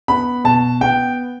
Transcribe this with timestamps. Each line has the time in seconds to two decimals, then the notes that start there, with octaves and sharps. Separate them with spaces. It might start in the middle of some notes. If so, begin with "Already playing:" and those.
0.08 B3 B5
0.44 B2 A5
0.81 B3 G5